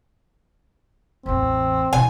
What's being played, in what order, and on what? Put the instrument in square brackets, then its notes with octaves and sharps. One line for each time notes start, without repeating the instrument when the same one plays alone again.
[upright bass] A1 E2 [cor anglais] C4
[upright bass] B2 E4 [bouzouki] G#5